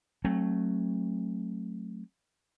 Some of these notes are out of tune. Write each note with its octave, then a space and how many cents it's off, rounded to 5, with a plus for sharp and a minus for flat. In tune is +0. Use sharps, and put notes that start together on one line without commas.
F#3 +0 A3 +0 C4 +45